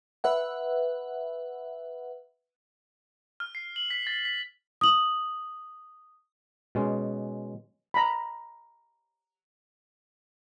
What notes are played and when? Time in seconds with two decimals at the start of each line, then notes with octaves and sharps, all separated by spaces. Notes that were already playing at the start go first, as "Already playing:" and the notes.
0.24 B4 E5 F#5
3.40 F6
3.55 C7
3.76 F#7
3.90 B6
4.07 A6
4.25 B6
4.81 D#6 F#7
6.75 B2 G#3 C#4
7.94 A#5 B5